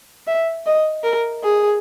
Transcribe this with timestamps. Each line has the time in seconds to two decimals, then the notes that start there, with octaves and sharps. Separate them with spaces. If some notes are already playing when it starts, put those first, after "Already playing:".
0.27 E5
0.66 D#5
1.04 A#4
1.43 G#4